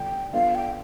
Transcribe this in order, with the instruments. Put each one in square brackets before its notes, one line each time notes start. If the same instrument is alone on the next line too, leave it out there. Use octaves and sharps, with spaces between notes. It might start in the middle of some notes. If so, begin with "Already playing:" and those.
Already playing: [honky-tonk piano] D3 G3 B3 F4 [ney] G5
[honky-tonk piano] B3 D4 F4 A4 [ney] F5
[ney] G5